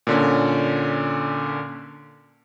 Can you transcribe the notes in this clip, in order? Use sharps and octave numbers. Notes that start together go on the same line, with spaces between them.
A#2 D3 C#4